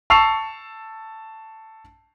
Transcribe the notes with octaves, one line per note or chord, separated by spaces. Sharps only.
A5 C#6 E6 C7 F7